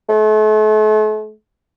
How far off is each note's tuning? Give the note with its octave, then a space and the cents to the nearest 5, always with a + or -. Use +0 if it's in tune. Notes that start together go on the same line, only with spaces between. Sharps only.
A3 -40